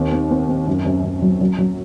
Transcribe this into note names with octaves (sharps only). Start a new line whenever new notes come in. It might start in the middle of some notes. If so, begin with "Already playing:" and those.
Already playing: D#2 C4
C4
C4
C4
F#2
F#2
F#2
F#3
F#3
F#3